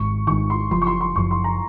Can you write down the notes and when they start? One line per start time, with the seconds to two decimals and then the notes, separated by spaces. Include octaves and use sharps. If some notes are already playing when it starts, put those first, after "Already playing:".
Already playing: G#1 G#2 C#6
0.27 G#1 G#2 D#3 C#6
0.50 C6
0.71 F#1 F#2 F3 C6
0.82 C#6
0.87 C6
1.01 C6
1.16 F#1 F#2 F3 C#6
1.31 C6
1.44 A#5